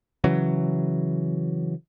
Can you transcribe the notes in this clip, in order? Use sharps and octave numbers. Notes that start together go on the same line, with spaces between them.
C#3 E3 F#3